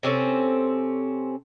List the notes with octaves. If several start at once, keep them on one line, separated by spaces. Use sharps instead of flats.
C3 C4 C#4 A4